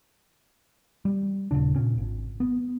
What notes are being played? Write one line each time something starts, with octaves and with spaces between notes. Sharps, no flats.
G3
D#1 D#2 C#3 D4
A#2 C#4
G#1
B3